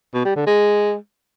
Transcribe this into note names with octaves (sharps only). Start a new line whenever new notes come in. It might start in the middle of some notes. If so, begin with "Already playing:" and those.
B2
G3
D3
G#3